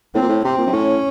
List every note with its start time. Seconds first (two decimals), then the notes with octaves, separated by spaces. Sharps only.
0.15 A2 C4
0.22 A#2
0.29 A2
0.44 C3 C4
0.58 A#2
0.67 F#2
0.73 A2 C#4